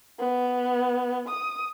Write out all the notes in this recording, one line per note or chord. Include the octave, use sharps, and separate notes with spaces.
B3
D#6